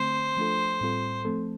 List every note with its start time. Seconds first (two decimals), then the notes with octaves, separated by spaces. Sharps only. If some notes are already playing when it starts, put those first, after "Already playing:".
Already playing: D3 A3 C4 C5
0.37 F3 A3 D4 F4 A4
0.81 A2 G3 C4 F4 A4
1.25 F3 A3 C4 A4